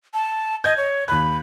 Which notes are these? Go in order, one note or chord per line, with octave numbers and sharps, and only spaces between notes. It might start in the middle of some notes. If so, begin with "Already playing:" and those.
A5
D#5 G6 G#6
C#5
D#2 B5 F#6